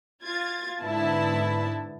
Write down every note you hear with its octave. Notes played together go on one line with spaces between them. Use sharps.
F4 G#6 A6
G#2 D3 B3 E4 A5